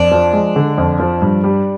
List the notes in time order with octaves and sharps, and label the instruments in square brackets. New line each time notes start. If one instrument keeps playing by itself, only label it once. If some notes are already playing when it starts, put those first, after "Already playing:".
Already playing: [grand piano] F2 [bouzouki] D4
[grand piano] F3
G#3
D3
F2
F3
G2
G3